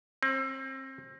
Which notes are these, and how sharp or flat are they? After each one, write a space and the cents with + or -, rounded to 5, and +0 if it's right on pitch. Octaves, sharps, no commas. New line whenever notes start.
C4 +30